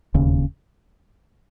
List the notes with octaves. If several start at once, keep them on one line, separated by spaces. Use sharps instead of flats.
E1 D#2 C#3